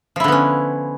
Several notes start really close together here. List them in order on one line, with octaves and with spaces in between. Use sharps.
F3 E4 D3 B3 C#4